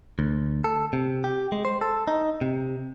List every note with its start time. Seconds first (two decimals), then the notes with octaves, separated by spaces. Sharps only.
0.19 D2
0.64 A4
0.93 C3
1.24 G4
1.52 G#3
1.65 C5
1.81 A4
2.08 D#4
2.41 C3